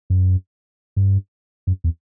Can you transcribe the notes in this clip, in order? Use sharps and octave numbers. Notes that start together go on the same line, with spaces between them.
F#2
G2
F#2
E2